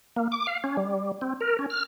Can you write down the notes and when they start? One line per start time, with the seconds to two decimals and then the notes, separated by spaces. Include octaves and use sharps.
0.16 A#3
0.32 D6
0.47 F5
0.64 C#4
0.77 G3
1.21 C4
1.41 A#4
1.59 C#4
1.70 F6